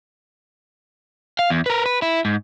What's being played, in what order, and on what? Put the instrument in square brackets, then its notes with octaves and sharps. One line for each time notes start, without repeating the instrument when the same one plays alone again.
[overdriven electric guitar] F5
E2
A#4 B4
B4
E4
G#2